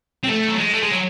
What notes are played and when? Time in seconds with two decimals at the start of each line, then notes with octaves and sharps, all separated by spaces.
0.23 C4
0.28 A3
0.48 F#3
0.58 G#3
0.73 A3
0.83 G#3
0.91 F#3